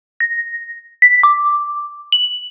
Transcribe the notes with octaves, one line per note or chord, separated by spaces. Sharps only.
A#6
B6
D6
F#7